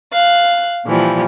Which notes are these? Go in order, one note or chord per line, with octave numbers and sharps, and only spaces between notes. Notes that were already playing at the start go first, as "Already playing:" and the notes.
F5 F#6
A#2 E3 F3 G3